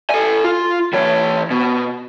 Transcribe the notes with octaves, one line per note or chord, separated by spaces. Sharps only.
A4 G#5
F4
E3 C#5
B2